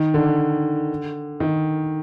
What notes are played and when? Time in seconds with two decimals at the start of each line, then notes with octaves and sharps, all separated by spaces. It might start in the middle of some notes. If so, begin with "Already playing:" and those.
Already playing: D#3
0.14 D3
1.40 D#3